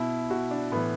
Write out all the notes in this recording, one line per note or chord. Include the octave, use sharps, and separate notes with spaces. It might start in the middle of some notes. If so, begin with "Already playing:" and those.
Already playing: B2 E4
B2 F#4
D4
A2 E3 B3